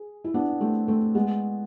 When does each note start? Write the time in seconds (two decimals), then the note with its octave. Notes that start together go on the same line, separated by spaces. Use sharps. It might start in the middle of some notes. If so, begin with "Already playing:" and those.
Already playing: G#4
0.24 E4
0.34 B3 D4
0.61 A3 C4
0.88 A3 C4
1.15 G#3 B3